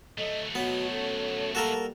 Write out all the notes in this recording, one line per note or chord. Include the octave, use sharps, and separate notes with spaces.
F#3 A3 A4 C#5 D#5
B2 B3 F#4 C#5
C#4 F#4 A4
G3 A#3 F#4 A4 A#4 A5